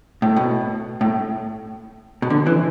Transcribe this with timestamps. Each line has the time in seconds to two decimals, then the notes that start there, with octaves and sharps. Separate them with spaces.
0.22 A2
0.36 B2
1.01 A2
2.22 B2
2.30 D3
2.47 E3